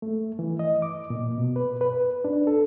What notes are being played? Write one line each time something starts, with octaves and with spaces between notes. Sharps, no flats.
A3
E3
D#5
D6
A#2
B2
B4
B4
D4
A4